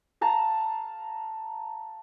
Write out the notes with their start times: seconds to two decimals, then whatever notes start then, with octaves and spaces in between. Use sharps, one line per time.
0.21 F5 A5 A#5